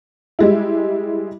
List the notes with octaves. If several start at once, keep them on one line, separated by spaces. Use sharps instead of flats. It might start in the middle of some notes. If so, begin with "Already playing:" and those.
G3 G#3 E4